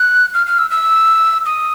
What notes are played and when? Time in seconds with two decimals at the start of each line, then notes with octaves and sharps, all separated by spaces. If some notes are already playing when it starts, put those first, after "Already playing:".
Already playing: F#6
0.34 F6
0.47 F6
0.58 E6
0.71 E6
1.46 D#6